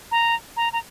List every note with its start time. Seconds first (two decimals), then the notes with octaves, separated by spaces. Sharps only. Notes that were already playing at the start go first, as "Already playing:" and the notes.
0.11 A#5
0.57 A#5
0.73 A#5